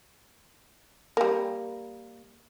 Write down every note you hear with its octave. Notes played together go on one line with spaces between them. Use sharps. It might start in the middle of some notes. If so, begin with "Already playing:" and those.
G3 A#3